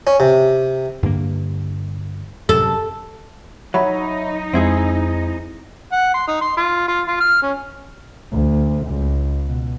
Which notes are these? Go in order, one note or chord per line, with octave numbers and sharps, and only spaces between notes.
C#4
C3
G2 D3 A#3
F#2 C3 A4
F#3 D#4 C#5 E5 B5
F2 G#3 C4 E4 G#4
F#5
C6
D#4
C6
F4
F4
F4
F6
C#4
D2
C#2
B2